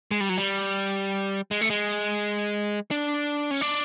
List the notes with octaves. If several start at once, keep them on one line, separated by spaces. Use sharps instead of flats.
G#3
G3
F#3
G3
G#3
A3
G#3
D4
C#4
D4